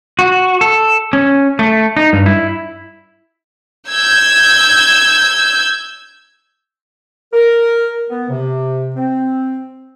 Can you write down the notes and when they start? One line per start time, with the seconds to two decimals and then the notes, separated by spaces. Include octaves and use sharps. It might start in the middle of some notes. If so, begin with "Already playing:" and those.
0.19 F#4
0.61 A4
1.13 C#4
1.59 A3
1.97 D#4
2.13 G2
2.26 E4
3.90 E6 G6 G#6
7.33 A#4
8.10 B3
8.30 C3
8.97 C4